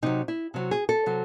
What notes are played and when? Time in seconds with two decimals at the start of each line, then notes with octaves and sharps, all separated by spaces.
0.03 C3 F#3 D#4
0.28 E4
0.54 C3 F#3
0.71 G#4
0.89 A4
1.06 C3 F#3